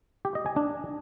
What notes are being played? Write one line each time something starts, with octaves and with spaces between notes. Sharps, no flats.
G4
D#5
G#5
D4